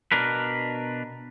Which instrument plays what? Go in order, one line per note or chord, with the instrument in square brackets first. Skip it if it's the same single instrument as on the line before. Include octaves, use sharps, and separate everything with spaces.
[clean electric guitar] B2 D4 A#4 B4